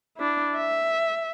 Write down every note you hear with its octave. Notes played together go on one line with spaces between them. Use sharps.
D4 E4
E5